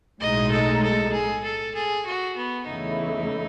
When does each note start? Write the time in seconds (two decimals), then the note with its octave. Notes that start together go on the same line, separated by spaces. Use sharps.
0.20 B1 A2 G#3 D#4 D#5
0.51 A4
0.82 A4
1.13 G#4
1.44 A4
1.75 G#4
2.06 F#4
2.37 B3
2.67 E2 C#3 E3 A3 D#4 E4